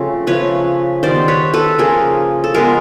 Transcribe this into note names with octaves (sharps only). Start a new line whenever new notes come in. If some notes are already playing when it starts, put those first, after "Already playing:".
Already playing: C#3 F3 A3 C4 A4
C#3 F3 A3 B4 C#5
D#3 G3 B3 C5 D5
B4 C#5
A4 B4
C#3 F3 A#3 G#4 A#4
A4
F3 G#3 B3 G#4 A#4